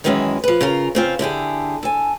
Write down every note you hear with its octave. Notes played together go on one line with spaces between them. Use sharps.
F#2 D#3 E3 G#3 C#4 E4
F3 B4
C#3 F4 A#4
C#3 C4 F4
D3 E4 G4 G#4
A4 G#5